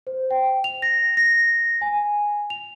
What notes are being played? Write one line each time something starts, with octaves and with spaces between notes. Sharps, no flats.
C5
G5
F7
A#6
A#6
G#5
F7